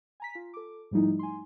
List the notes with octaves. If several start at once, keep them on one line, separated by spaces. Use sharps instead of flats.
G#5 A#5 B6
F4
A4 D6
G#2 F3 G3 A3 D#4 E4
G#5 C6